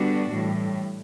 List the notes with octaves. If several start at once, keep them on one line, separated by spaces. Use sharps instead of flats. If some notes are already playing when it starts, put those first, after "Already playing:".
Already playing: D3 G3 B3 D4 F#4
A2 E3 G3